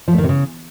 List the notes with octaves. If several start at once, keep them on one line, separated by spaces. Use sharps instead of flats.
F3
A3
D#3
C3
C#3